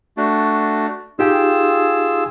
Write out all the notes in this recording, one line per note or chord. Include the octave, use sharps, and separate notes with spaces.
A3 D4 F#4
D#4 F4 G4 G#4 G5 E6